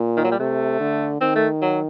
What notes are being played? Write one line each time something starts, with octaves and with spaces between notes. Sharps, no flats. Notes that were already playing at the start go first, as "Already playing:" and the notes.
Already playing: A#2
D#3
F#3
G3
C3 A3
D3
D#3 C4
A3
F#3